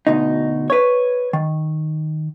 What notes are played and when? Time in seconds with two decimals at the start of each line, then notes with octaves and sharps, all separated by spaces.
0.07 D2 B2 D#4
0.70 B4 C#5
1.33 D#3